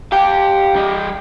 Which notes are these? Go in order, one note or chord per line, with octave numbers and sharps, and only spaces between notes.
G4 F5 G5
G3 D#5